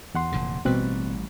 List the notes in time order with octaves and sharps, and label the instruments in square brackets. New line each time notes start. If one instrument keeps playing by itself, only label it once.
[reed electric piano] E2 F#5 C6
[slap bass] F1 A#2 D3
[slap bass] A1 G3 [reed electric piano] B2 C4 F#6